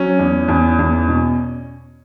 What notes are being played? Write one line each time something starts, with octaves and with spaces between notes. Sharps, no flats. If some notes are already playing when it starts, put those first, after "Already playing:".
Already playing: F#3 C#4
E2
E2
E2
B2